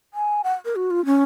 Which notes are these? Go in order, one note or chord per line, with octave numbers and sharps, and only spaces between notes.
G#5
F#5
A#4
F#4
F4
C#4